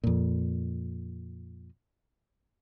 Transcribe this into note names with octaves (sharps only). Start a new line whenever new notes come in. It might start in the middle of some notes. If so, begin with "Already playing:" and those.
F2 A#2